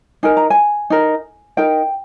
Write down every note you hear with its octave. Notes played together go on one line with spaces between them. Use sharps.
D#4 A#4 G#5
A#5
G#5
D#4 A#4
D#4 A#4 G5